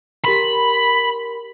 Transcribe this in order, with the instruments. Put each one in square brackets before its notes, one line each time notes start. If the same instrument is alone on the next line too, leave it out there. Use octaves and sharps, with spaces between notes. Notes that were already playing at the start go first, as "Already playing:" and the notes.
[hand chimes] G4 A#4 C6 [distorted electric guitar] B5